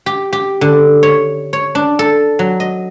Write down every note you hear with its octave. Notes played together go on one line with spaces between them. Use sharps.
G4
G4
D3
C#5
C#5
D4
A4
F#3
D#5